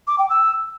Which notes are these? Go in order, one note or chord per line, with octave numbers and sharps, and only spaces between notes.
D6
G5
E6